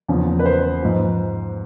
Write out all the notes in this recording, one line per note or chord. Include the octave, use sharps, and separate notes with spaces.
E2 C#3 F3
B4
C5
G#2 F3